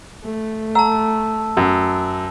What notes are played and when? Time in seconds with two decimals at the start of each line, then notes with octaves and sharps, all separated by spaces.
0.24 A3
0.75 F#5 A5 A#5 E6
1.57 F#2